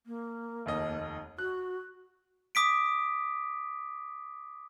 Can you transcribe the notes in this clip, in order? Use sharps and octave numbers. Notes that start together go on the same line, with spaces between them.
A#3
F1 D#2 D#5
F#4 F#6
D6 D#6 B6 D7